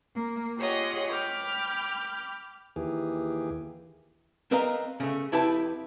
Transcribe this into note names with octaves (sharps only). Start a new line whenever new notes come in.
A#3
F4 G4 G#4 C#5 D#5 F#5
G5 B5 D6 F6 G6
D#2 E3 G4 G#4
C4 A#4 B4 D#5 F5 A#5
C#3 A3
F2 E4 G4 B4 A5